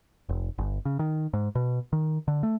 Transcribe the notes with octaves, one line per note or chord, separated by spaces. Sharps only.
F1
G1
C#3
D#3
G#2
B2
D#3
D3
A3